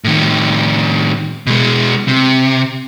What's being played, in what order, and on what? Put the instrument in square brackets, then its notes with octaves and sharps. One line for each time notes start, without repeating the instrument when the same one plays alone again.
[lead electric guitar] A2 D#3
B2 G#3
C3